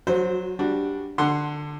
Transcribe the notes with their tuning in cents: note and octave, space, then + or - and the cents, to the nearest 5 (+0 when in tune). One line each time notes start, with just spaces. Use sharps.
F#3 +0 F#4 -30 C5 +0
G3 +0 D4 +0 F#4 -5
D3 +15 F#5 +0 C6 +0